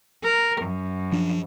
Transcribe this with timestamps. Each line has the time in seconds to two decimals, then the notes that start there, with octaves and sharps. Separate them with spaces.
0.24 A#4
0.62 F#2
1.12 F3 D4